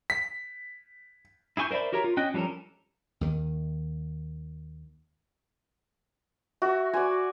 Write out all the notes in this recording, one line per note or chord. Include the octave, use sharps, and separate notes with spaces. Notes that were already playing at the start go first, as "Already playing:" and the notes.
B6
E4 G#4 G#5 C#6 G6
A#4 C5 D5 E5 B5
F#4 G4 A#4 C#5 A#5
F4
C#4 D#5 G5 F#6
F3 G3 C#4 A4 A#4
D#2 D#3
F#4 E5 C#6
F#4 D5 G#5